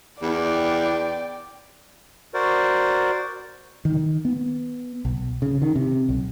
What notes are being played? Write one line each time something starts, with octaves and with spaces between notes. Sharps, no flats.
E2 D5 G5
F#4 A#4 C5 D5
D#3
B3
B1
C#3
D#3
C3
B1